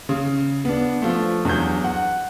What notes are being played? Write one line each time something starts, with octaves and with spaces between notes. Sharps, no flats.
C#3
B3 D4
F3 A3
E2 G2 F#3 G6
F#5